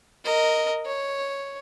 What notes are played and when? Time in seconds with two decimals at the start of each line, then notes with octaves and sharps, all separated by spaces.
0.25 A#4 D#5
0.86 C#5